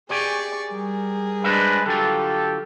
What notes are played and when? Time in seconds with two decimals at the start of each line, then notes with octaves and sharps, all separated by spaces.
0.10 G4 G#4 D5 G5 G#5 C#6
0.69 G3 G#4 A#4
1.44 G#3 D4 B4 C5 D#5 E5
1.86 D3 F#3 F4 G4 A4